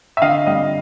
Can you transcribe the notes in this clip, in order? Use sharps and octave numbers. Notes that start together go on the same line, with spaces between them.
E5
D3 D#5 F5
G3 D#5 F5